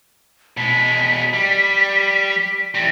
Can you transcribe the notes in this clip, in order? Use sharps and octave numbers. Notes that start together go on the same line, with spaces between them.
B2 G#3 B6
G3
E3 G3 A#6